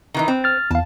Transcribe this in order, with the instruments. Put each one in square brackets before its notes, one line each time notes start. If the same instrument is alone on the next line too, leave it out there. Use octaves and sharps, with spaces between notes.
[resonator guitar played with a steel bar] D#3 E3 D#4
C4
[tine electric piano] F6 A6
[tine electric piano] E2 F5 [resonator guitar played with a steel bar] A5